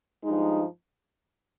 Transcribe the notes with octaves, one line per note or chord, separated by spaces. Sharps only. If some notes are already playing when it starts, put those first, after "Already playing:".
G2 F3 G#3 D#4